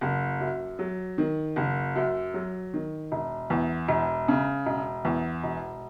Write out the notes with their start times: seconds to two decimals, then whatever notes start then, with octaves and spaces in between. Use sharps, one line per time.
0.01 F#1
0.40 F#2
0.79 F#3
1.18 D#3
1.56 F#1
1.95 F#2
2.34 F#3
2.74 D#3
3.12 E1
3.50 E2
3.88 E1
4.28 C#3
4.66 E1
5.05 E2
5.43 E1